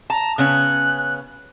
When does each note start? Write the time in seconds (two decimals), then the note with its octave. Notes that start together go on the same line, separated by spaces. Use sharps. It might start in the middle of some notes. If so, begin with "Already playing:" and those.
0.10 A5 A#5
0.38 C#3 B3 C#4 F#6